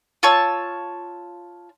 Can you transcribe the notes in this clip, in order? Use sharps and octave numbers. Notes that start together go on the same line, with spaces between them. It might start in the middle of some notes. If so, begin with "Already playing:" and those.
F4 C#5 A5 E6